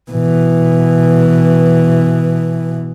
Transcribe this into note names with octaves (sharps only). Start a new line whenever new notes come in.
B2 E3